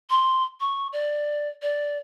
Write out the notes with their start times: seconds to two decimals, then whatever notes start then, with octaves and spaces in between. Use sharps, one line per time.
0.10 C6
0.60 C#6
0.93 D5
1.62 D5